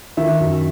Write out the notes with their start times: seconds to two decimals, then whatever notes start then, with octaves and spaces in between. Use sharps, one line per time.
0.17 D#3 E5
0.40 F#2